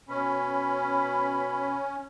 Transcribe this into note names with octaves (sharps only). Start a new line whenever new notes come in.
B2 C#4 B5